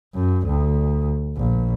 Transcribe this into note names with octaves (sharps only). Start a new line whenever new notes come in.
F#2
D2
A#1